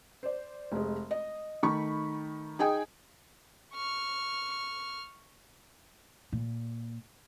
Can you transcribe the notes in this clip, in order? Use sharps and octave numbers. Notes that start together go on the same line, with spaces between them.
C5 D5
F1 G#3
D#5
D#3 A3 B5 C#6
D#4 G#4 G5 G#5 D#6
C#6 F6
A#2